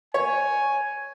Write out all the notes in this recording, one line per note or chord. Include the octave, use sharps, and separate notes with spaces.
C#5 G#5